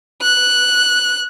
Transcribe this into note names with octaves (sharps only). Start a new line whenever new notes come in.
F#6